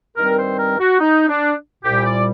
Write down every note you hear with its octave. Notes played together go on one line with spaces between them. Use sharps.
G2 D#3 G3 C4 A#4
C5
A#4
F#4
D#4
D4
C2 A#2 G3 G4
D5